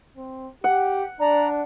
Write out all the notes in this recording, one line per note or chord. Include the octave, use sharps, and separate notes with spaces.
C4
G4 F#5
D4 D5 A#5